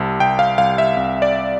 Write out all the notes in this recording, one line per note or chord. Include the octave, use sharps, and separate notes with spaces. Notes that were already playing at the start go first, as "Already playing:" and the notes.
Already playing: C2 C3 A5
C2 G5
F5
C2 F5
E5
C2
D5